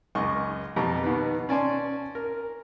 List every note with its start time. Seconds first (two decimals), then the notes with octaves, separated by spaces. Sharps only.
0.15 C#2 F#2 G#3 D#5 C#6
0.76 F2 B2 G4 A#5
1.03 B2 D#3 B3
1.49 C#4 D5 G#5 A5 C6
2.15 A#4